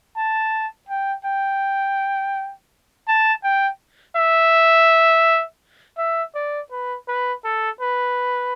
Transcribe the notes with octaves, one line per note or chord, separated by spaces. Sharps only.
A5
G5
G5
A5
G5
E5
E5
D5
B4
B4
A4
B4